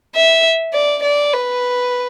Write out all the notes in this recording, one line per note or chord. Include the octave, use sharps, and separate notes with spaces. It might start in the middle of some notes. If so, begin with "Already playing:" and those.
E5
D5
D5
B4